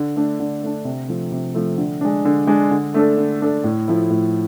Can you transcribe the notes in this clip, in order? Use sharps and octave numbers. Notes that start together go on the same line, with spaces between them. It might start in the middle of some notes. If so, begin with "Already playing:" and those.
Already playing: D3
A3 D4
D3
A3 D4
C3
F3 A3
C3
F3 A3
D3
G#3 D4
D3
G#3 D4
D3
A3 D4 A4
D3
A3 D4 A4
A2
F3 A3 E4
A2